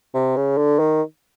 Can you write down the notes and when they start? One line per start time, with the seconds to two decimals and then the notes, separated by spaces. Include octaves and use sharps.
0.14 C3
0.36 C#3
0.58 D3
0.79 D#3